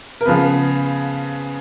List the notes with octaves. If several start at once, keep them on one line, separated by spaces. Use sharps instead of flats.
A#4
C#3 F3 B3 B4